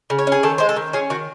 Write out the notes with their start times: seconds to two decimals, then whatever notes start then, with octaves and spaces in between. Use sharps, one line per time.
0.10 C#3
0.19 C#5
0.27 C#4
0.32 G#4
0.43 D#3 A4
0.58 G#3 C5
0.69 A4
0.76 D#3
0.93 C#4 G#4
1.10 D#3 F#4